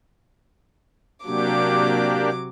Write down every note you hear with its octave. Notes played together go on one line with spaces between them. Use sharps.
C3 F#3 A#3 D4 G4 D6